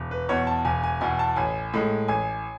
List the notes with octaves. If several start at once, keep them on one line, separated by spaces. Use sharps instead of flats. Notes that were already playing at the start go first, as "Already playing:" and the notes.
Already playing: E1
B4
E2 B2 C#5
A5
E1 G#5
G#5
E2 B2 G#5
A5
A1 G#5
A2 G#3
A1 G#5